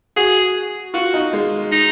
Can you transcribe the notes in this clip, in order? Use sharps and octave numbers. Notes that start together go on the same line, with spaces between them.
F#4 G#4
F4 F#4
D#4
G#3
D#4